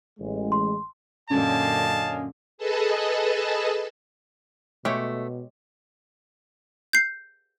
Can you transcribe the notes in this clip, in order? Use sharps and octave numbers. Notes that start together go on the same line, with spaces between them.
A1 G#3
C6
F#2 A#2 D3 C#4 D#5 F5 G#5 A5
G#4 A4 B4 D#5 A5
B2 G#3 A3 G4 C#5
G6 C7